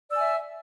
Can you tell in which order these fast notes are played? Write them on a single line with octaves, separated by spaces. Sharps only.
D5 E6 G#5 E5